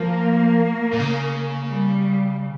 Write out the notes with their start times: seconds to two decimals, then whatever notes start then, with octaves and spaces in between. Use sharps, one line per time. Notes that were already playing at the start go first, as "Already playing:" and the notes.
Already playing: F3 A#3
0.93 A#2
0.99 C#3
1.70 G3